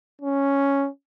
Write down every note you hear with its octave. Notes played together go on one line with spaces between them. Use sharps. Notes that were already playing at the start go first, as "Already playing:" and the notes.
C#4